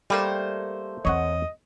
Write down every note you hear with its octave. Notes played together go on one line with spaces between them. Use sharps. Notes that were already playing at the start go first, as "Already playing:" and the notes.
G3 A3 A#3 C5
E2 C4 C#5 D#5 F#5